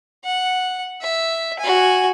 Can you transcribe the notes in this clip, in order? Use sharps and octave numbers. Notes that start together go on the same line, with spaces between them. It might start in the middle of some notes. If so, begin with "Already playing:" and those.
F#5
E5
F#4 G#5